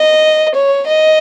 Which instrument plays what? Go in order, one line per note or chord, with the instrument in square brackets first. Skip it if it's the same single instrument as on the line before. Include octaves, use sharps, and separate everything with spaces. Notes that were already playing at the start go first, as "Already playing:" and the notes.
Already playing: [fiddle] D#5
C#5
D#5